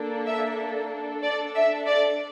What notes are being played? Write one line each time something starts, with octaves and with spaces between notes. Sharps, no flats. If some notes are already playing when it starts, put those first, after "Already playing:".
Already playing: A#3 D4 A4
E5
D4 A4
D5
E5
D5